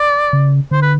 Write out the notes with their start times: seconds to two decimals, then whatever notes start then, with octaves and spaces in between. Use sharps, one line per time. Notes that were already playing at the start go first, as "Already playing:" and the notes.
Already playing: D5
0.33 C#3
0.71 D3 C5
0.82 B4